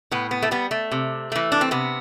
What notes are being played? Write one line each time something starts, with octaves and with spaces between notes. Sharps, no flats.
A2 B3
B3
A3
G3 B3
A3
C3
E3 A3
D4
C4
C3 B3